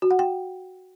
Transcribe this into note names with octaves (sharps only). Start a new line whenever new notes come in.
F#4
F#5
G5